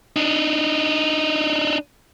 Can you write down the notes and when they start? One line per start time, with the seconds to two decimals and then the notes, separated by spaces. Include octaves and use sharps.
0.16 D4 D#4